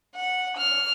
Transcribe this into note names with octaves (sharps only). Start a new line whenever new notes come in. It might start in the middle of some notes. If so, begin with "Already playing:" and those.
F#5
F6